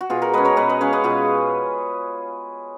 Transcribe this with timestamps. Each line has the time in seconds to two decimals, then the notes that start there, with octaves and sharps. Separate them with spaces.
0.01 F#4
0.10 B2 F4 G#4
0.22 F#4 A#4
0.33 G#3 C#4 B4 D#5
0.45 A#4 C#5
0.57 B2 B4 D#5
0.69 B4 D#5
0.81 G#3 C#4 C#5 F5
0.93 B4 D#5
1.04 B2 F4 G#4